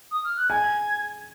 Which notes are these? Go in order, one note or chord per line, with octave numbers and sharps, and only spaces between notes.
D#6
F6
F#6
G#5 G#6